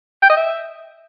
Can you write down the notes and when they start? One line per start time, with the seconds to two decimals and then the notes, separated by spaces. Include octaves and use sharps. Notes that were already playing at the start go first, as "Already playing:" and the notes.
0.23 G5
0.30 D#5
0.37 E5